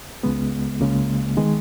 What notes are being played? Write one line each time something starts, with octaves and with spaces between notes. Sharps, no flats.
C#2 C#3 G#3 B3
C#2 C#3 G#3 A#3
D#3 G#3 B3